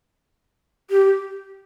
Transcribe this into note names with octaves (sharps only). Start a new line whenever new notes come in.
G4